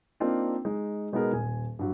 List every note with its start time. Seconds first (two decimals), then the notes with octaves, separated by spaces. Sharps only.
0.20 A#3 C4 D4 D#4 F4
0.65 G#3 D#4
1.12 B2 G#3 B3 D#4 G#4 A#4
1.33 D#1 G#5
1.79 G2 F#3